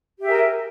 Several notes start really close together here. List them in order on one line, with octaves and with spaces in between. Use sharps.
G4 E5 G#4 A#4